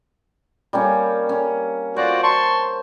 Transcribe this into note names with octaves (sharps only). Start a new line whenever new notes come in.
G3 A#3 C#4
C#4
F4 F#4 C5 D5
A5 C6 C#6